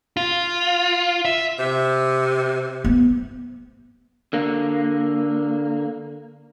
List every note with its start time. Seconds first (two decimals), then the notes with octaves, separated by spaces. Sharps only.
0.17 F4
1.25 E5
1.59 C3
2.84 B3
4.33 D3 A#3